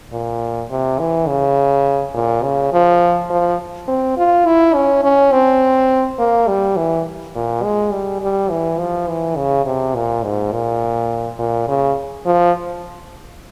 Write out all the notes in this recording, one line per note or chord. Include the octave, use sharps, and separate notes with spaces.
A#2
C3
E3
C#3
A#2
C#3
F3
F3
C4
F4
E4
C#4
C#4
C4
A#3
G3
E3
A#2
G#3
G3
G3
E3
F3
E3
C#3
C3
A#2
G#2
A#2
A#2
C#3
F3